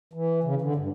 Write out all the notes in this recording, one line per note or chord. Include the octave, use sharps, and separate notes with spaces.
E3
C#3
D3
G2